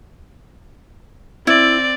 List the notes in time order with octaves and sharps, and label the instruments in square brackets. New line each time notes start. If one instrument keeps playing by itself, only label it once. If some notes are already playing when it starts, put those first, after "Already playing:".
[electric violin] C4 D5 [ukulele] E4